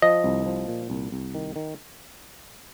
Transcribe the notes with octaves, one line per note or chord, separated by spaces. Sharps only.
F3 D#5
C2
F3
A#2
C2
C2
D#3
D#3